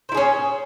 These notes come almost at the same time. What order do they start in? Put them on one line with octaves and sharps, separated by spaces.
C5 E4 G#4 C#4